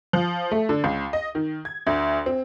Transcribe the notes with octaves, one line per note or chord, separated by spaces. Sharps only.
F3
A3
D3
C#2
D#5
D#3
G#6
D2
C4